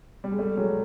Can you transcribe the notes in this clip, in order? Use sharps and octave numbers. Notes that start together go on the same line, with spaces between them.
G3
G#3
G3 A3
F#3 G#3